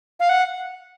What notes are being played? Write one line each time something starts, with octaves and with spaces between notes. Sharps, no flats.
F5
F#5